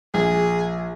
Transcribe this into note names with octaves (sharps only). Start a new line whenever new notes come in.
A#1 G#4